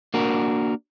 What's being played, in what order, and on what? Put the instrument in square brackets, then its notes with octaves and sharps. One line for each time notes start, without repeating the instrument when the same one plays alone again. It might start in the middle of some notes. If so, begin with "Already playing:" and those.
[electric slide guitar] A#3 D4 F#4 A#4